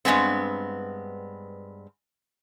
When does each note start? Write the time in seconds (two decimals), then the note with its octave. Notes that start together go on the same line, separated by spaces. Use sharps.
0.05 G2 C#3 G#3 B3 C4